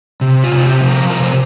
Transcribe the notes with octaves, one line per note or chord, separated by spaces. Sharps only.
C3
F4
C3
F4
G4
F3
A#4
C3 A#4
C5